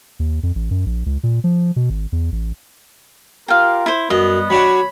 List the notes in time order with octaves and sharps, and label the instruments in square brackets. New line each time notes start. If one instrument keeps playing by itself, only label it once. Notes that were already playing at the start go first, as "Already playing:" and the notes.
[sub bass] D#2
F2
A1
F#2
A#1
C#2
A#2
F3
B2
G#1
E2
A1
[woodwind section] F4 G4 A#4 [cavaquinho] F5 G5
[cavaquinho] E4 C5
[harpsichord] F#2 [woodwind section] G3 B3 [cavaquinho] D#5
[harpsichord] F#3 D4 F#4 [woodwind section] C#5 B5